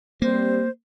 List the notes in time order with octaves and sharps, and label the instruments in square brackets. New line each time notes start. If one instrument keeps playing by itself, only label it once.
[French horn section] G3 C4 [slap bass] A#3 [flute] C5